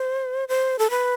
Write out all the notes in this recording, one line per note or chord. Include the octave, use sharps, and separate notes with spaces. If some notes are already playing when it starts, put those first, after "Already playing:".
Already playing: C5
C5
A4
B4